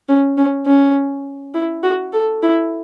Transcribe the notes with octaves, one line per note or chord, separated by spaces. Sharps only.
C#4
C#4
C#4
E4
F#4
A4
E4